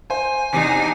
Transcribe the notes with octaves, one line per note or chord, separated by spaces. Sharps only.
C5 G#5
E2 C3 D4 D#4